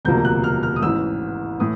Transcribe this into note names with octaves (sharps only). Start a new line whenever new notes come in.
E1 D2 C3 F3 A#3 G6
F#6
F6
F6
D#6
A1 G#2 E3 E6
A2 E3 D#6